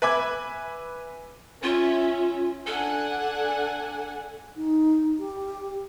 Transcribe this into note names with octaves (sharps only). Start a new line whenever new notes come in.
B4 E5 G#5 B5 D6 G#6
C#4 F4 E5
D4 A4 F#5 G#5
D#4
G4